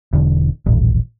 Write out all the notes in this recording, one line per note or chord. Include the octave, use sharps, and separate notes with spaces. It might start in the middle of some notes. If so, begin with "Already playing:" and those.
E1 D3
D#1 A1